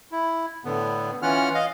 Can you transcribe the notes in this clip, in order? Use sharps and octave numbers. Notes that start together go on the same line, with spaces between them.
E4
A2 D3 B3
E3 C#4 F4 F#5 F6
D#5 F5